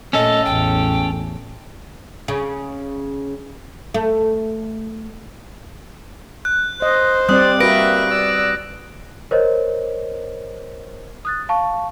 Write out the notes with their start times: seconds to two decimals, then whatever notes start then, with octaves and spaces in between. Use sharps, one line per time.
0.13 A#2 A3 C#4 A4 D#5
0.45 A1 E2 G5
2.28 C#3
3.94 A3
6.45 F#6
6.82 C5 D#5
7.29 G3 C4 D5 D#6 F#6
7.60 A#3 F#4 B4 E5 A#6 D7
8.10 D5 E6
9.31 A#4 C5 C#5 D#5
11.25 D#6 F#6 A6
11.49 F5 A5 C#6